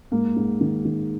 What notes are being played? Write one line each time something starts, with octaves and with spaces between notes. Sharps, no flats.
G#2 A#3
G#2
D#3
D#3